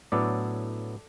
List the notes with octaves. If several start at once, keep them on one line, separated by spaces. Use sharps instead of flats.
A2 F#3 B3 D4 A4 D5